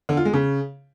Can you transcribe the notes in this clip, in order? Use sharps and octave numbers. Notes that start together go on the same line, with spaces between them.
D3
F4
G#3
C#3